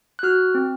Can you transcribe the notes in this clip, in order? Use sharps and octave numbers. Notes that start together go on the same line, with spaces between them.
F#6
F#4 F6
C4